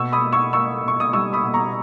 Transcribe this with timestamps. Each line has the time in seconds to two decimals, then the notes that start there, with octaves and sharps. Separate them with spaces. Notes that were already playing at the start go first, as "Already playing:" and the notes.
Already playing: B2 C#6 E6
0.12 B5 D#6
0.23 A#3
0.32 C#6 E6
0.53 A#3 C#6 E6
0.83 B2 C#6
1.00 D#6
1.13 G3 C#6 E6
1.33 B5 D#6
1.43 B2
1.54 A#5 C#6